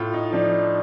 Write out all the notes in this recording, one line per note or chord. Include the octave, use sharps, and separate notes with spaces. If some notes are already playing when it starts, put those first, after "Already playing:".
Already playing: A2 F4
D#4
F3 D4